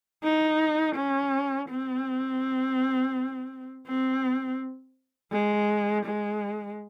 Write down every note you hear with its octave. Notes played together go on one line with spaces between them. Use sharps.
D#4
C#4
C4
C4
G#3
G#3